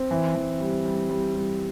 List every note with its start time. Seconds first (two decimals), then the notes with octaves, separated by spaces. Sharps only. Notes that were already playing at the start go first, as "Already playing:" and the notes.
Already playing: C4
0.11 E3
0.35 E3
0.60 G3
0.85 G3
1.09 G3
1.35 G3